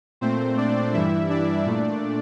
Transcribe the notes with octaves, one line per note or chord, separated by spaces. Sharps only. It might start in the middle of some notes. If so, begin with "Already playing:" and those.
A#2 A3 C4 C5
D4 D5
G2 E3 G3 E4 E5
D4 D5
A#2 A3